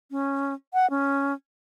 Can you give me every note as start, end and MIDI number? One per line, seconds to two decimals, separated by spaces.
0.11 0.54 61
0.74 0.89 78
0.90 1.33 61